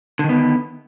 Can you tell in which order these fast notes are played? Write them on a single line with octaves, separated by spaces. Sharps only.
D3 D#3 B3